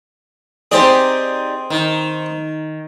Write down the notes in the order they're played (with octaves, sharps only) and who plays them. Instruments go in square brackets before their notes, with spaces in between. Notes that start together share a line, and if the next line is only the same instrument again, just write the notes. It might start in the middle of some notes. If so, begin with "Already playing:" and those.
[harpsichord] C4 G#4 [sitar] D#4 G4 D5
[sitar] D#3